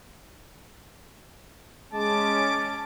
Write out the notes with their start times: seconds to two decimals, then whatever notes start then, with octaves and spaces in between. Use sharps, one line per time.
1.93 G#3 C#4 A5 D6